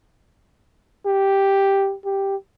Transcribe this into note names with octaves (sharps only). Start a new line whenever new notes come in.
G4
G4